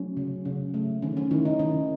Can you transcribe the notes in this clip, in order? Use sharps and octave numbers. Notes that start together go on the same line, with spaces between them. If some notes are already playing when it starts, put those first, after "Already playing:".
Already playing: F#3 A3 C#4
C#3
C#3
A3
D#3 C#4
C#4
D#3 E4
D#4
D#3 C#4